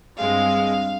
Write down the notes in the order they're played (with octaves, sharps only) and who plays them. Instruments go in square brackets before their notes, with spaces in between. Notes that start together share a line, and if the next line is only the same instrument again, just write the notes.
[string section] G2 G#3 C4 [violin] F5